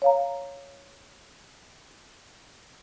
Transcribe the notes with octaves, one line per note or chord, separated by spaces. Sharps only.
C#5 F5 A#5